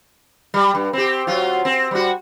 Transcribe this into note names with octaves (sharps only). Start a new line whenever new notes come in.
G3
G2
C4 G4
F#3 F4
C4
G3 F#4